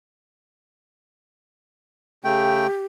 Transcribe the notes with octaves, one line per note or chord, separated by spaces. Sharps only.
C#3 A3 G4 G5